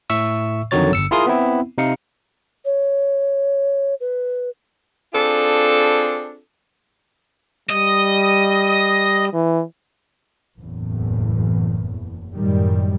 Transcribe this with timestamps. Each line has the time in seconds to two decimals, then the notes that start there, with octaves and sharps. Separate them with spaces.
0.10 A2 E5 C#6 E6
0.71 F2 D3 D#3 F#3 C#5 A6
0.91 G1 E6 C#7
1.11 E4 F4 G#4 A#4 C6 D#6
1.27 B3 C4 E4
1.78 C3 D#4 F5 C#7
2.65 C#5
4.00 B4
5.13 C4 D4 F4 G#4 A4
7.69 G3 D#5
9.33 E3
10.61 F#1 E2 A2
12.34 F#2 A2 D#3 G3